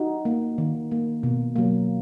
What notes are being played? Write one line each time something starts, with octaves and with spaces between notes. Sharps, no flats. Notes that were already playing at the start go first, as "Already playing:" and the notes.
Already playing: D#4 F#4
A#3
D#3
A#3
B2
F#3 A#3